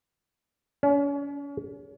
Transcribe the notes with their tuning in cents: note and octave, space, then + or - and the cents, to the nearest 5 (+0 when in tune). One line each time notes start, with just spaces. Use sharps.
C#4 +40